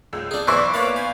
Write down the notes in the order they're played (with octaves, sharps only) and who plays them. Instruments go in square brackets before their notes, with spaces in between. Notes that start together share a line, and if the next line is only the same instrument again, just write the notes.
[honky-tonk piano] C#2 G#3 E6
[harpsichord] D4 G#4
[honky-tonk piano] B1 D5 C#6 [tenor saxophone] E3 [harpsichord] C5 [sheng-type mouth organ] E5 D6
[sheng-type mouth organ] A#3 E4 D6 [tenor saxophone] B4 [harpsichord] C#5 F5 A5
[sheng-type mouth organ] C5 G#5 [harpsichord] F5